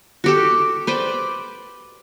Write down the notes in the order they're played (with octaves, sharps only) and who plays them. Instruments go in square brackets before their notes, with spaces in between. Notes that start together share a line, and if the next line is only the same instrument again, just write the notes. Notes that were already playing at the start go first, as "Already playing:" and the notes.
[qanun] F#4 G4 A4
B4 C5 D5 G5